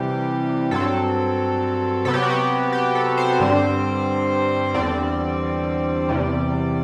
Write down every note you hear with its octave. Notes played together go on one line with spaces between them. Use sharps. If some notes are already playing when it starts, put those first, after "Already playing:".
Already playing: C3 E3 G3 G4
G2 F#3 C4 A4
C3 F#3 B3 A4
G4
F#4
G4
G4
A4
C5
G2 D3 G3 C4
E2 D3 G3 C4 D5
E2 C3 G3